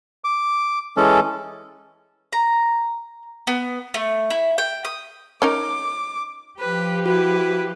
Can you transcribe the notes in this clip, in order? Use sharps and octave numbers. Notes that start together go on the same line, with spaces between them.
D6
E3 G#3 C#4 A4
A#5
B3
A3
E4
G5
D#6
C#4 D#4 A#4 D6
F3 G4 B4
E4 F#4 B4